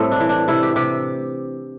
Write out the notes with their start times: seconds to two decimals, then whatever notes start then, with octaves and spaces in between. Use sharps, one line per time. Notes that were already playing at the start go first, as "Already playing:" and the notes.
Already playing: A2 G3 A3 C4
0.12 D4
0.20 E3
0.29 D4
0.48 C3 E4
0.63 G4
0.76 C3 G4